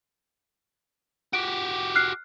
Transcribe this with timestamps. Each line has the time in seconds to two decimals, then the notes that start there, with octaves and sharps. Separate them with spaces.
1.33 F#4 G4 D7
1.95 F6 F#6 C7